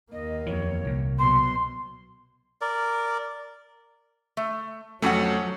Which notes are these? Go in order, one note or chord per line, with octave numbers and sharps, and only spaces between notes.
D#2 A#3 D#5
F2 E3 C#5
C2 A#2
B2 F#3 C6
A#4 D5
A3
F2 F#3 A3 C#4 F#4 F#5